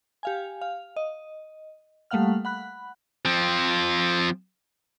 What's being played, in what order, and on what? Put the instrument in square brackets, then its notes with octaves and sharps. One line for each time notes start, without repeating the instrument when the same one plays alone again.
[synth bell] G4 F5 G#5
F5
D#5
G3 A3 A#3 F5 F#5 F6
F#5 B5 F#6
[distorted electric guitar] F3 C4